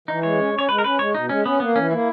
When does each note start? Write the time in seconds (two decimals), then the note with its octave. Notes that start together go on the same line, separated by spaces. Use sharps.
0.08 E3 D#4
0.23 G#3 C#5
0.38 C#4
0.54 C#4 C#5
0.69 G#3 B4
0.78 A#4
0.84 C#4 B4
0.99 G#3 C#5
1.15 B2 D#4
1.29 G#3 C#4
1.45 B3 C#4
1.60 A#3 B3
1.76 E3 C#4
1.91 A#3 E4